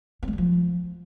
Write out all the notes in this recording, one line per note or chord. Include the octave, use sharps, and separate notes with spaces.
C4
G#3
G3
F3